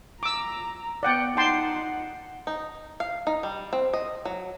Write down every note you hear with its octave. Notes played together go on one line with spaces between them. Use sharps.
A#5 D6 E6
B3 D5 F#5 G5
D#4 F#5 G5 A5 C6
D#4
F5
D#4
G3
C4
D#5
F#3